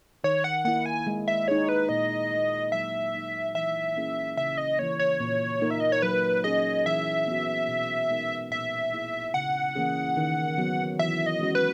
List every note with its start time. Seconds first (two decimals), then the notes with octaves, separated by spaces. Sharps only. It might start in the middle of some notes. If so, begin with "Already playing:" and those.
0.24 D#3 C#5
0.44 F#5
0.65 A#3 E4 F#5
0.86 G#5
1.07 G#3
1.28 E5
1.48 D#4 G#4 C#5
1.69 B4
1.89 A#2 D#5
2.31 A#3 D#4
2.72 F#3 E5
3.13 A#3 D#4
3.55 E3 E5
3.96 A#3 C#4 E4 G#4
4.37 C#3 E5
4.58 D#5
4.79 E3 A#3 C#5
4.99 C#5
5.20 A#2
5.61 A#3 D#4 A#4
5.70 E5
5.80 D#5
5.92 C#5
6.02 F#3 B4
6.44 C#4 G#4 D#5
6.86 E3 E5
7.27 B3 F#4
7.68 B2
8.09 G#3 B3 D#4 A#4
8.51 A#2 E5
8.92 A#3 E4 G#4
9.34 C#3 F#5
9.76 E3 A#3 C#4 G#4
10.17 D#3
10.58 F#3 B3 F#4
10.99 E3 E5
11.26 D#5
11.40 G#3 C#4 F#4
11.55 B4